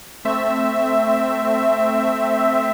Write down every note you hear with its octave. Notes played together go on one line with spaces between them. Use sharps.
A3 C4 E5